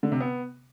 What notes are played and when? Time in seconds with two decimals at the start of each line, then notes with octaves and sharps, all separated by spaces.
0.03 D3
0.12 C3
0.20 B3